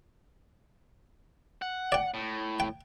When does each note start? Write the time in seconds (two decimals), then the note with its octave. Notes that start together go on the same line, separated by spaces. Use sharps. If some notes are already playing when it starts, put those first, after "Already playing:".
1.62 F#5
1.92 D5 G5
2.14 A2
2.60 G5